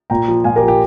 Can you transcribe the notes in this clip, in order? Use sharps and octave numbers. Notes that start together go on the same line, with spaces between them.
A#2 G5 A#5
F3
A#2 F5 G#5
G4 A#4
F3
G4